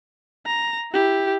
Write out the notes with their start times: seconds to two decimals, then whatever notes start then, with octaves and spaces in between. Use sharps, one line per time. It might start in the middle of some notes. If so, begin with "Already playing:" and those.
0.46 A#5
0.93 E4 G4